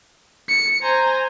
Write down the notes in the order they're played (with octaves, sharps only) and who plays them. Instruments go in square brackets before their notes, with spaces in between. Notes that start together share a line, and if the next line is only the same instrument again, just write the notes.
[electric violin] C#7
[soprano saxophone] C5 [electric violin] G#5 A#5